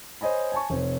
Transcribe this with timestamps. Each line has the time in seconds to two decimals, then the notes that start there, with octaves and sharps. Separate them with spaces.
0.21 C5 C#5 D#5 G#5 B5
0.52 G#5 A5 C#6
0.70 F1 C4 C5 C#5